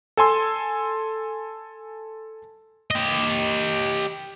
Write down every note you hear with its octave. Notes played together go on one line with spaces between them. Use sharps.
A4 G#5 C6 E6
G4 D#5